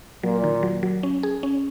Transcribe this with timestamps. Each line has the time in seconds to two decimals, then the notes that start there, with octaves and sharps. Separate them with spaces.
0.23 A#2 F#3
0.44 D#3
0.63 F#3
0.83 F#3
1.03 C#4
1.23 G#4
1.43 C#4